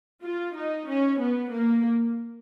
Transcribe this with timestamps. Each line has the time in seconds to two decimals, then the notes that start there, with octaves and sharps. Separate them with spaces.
0.23 F4
0.55 D#4
0.88 C#4
1.20 B3
1.52 A#3